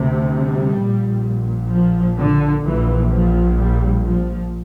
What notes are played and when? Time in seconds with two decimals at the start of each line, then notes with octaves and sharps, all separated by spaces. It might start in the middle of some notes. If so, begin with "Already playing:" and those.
Already playing: D2 C3
0.34 G3
0.79 A#1 A#2
1.71 F3
2.17 D3
2.64 A#1 A#2 E3
3.10 F3
3.56 G3
4.03 F3